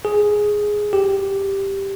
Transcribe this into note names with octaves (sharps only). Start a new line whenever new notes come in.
G#4
G4